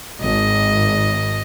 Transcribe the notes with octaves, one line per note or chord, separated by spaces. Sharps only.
G#1 D#5